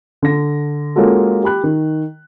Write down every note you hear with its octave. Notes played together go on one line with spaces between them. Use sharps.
D3 A#6
G#3 A#3 C#4 F4 F#4 A4
G4 B5 F#6
D#3